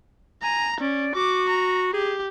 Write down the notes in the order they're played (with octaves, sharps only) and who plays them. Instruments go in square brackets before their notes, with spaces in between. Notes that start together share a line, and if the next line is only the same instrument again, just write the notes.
[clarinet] G#5 [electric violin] A#5
[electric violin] C#4 [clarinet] D5
[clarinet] F#4 [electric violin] D6
[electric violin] A#5
[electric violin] G4 [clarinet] G#4